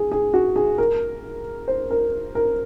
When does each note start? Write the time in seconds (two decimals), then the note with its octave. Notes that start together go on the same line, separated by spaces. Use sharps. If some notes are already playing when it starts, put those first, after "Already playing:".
Already playing: G#4
0.11 G#4
0.34 F#4
0.56 G#4
0.78 A#4
1.68 C5
1.91 A#4
2.35 A#4